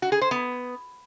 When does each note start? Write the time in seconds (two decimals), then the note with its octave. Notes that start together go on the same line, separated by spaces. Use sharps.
0.02 F#4
0.12 G#4
0.22 C5
0.31 B3